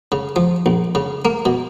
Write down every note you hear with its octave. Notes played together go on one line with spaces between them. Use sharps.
C#3
F3
A#1
C#3
A#3
B2